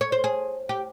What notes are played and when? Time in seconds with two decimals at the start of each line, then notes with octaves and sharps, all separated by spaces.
0.01 C#5
0.12 C5
0.24 G#4
0.69 G4